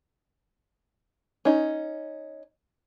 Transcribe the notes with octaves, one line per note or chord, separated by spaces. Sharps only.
C#4 D#4